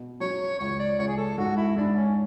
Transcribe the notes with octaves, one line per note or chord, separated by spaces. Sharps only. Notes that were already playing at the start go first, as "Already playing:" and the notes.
Already playing: B2
F#3 C#5
C#2 C#5
D5
C#2 C#5
G#4
A4
G#2 F#4
E4
G#2 D4
C#4